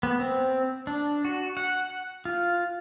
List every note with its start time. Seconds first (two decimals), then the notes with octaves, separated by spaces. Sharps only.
0.03 B3
0.20 C4
0.87 D4
1.25 F#4
1.57 F#5
2.25 F4